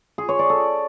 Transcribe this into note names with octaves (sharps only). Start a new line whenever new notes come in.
G#4
C#5
D5
A4